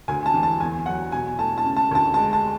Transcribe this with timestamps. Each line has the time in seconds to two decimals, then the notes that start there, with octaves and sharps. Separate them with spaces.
0.08 D2 G#5
0.26 A5
0.34 E3
0.43 A5
0.60 E2 G#5
0.86 F#3 F#5
1.12 B2 G#5
1.39 A3 A5
1.58 A5
1.64 C#3
1.76 A5
1.91 D2 A5
2.14 G#3 A5
2.33 A5